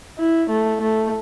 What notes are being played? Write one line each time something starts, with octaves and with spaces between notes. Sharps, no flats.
E4
A3
A3